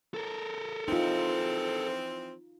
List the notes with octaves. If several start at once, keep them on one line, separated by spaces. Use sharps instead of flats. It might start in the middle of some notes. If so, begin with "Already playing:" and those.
A4 A#4
E3 F3 C4 D#4 F4